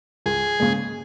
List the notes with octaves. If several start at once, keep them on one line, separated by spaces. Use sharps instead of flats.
C#2 G#4
C#3 G#3